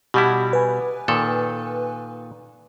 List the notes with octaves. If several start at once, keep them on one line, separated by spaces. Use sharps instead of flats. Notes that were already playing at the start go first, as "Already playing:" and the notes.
B2 G3 E4 G4 F#5
B4 G#5
A#2 D#3 A4